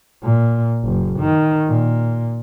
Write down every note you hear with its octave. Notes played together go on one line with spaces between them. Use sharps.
A#2
F#1
D#3
A#2